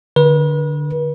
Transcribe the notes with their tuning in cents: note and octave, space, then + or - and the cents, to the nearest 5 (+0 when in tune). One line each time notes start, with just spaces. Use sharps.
D3 +10 B4 -40